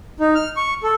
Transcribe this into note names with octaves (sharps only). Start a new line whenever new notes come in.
D#4
F6
C#6
A4